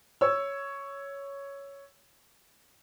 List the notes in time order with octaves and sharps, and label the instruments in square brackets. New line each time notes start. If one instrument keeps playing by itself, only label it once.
[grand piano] C#5 E6